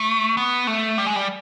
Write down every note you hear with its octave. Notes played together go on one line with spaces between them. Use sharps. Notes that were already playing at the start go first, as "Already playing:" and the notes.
Already playing: A3
B3
A3
G3
G#3
G3